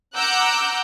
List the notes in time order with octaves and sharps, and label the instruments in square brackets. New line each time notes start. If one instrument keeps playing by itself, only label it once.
[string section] F#5 A#5 D6 E6 F#6 G6